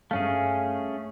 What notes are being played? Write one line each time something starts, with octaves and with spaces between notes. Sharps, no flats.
G2 A3 C#4 G#4 F5